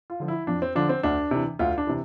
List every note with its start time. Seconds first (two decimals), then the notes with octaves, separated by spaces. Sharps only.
0.10 F4
0.20 D3 F3
0.28 E4
0.47 F2 D4
0.62 C4
0.75 D3 F3 D4
0.89 C4
1.03 D2 D4
1.31 C3 E3
1.59 D2 F4
1.78 D4
1.87 C3 E3